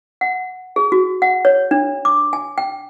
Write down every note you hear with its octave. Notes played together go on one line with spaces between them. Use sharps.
F#5
G#4
F#4
F#5
C#5
D4
D6
G#5
G5